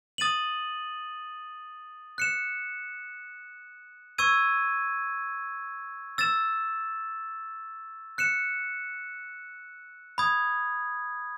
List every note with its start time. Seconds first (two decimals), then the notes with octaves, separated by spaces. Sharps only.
0.18 D#6 A6 D#7 F#7
2.18 F#6 C#7 E7
4.18 C#6 E6 G#6 D#7
6.18 E6 A6 E7
8.18 F#6 C#7 E7
10.18 B5 D#6 G#6